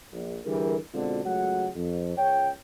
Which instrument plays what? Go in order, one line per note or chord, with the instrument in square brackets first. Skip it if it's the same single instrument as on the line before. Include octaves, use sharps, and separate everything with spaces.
[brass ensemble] A#1
D3 E3 G3 G#4 A#4
B2 D3 G#3 C4 F4 F#4
C#2 F#3 G#3 A3 F#4 F#5
F2
C#2 C#5 G5